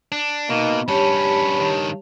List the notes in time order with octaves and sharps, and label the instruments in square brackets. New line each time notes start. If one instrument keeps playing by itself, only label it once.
[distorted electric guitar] D4
[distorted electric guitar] B2 [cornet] A#3 [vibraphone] D#4 D#5
[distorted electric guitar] G2 C#4 [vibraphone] G4 C#5 A5 [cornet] B5
[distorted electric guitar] G2 D#3